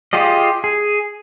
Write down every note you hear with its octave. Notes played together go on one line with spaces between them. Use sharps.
F4 G4 G#4 D#5
G#4